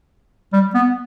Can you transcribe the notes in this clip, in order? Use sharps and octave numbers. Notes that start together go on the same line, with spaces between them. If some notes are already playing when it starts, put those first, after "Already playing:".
G3
B3